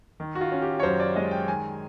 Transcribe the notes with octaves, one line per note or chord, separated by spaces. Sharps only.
D#3
F#4
F4
C#4
G4
C#5
F#2 C5
D5
G#3 D#5
G5
D#3 G#5